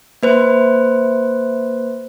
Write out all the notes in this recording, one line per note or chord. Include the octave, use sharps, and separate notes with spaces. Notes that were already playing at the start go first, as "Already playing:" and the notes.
A#3 B4 C5